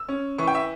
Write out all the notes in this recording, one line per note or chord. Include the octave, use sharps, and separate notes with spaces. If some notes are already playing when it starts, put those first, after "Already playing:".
Already playing: E6
C#4
E3 C#6
G5
E5